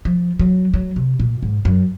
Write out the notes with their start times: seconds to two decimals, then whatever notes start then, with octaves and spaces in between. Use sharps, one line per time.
0.05 F3
0.39 F#3
0.74 F#3
0.96 C3
1.20 A#2
1.42 G#2
1.65 F#2